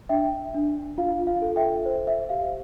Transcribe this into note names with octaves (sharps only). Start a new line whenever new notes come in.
D4 E5 G5
D4
F4 F5
F5
A4
E5 G5
C5
E5
G4 F5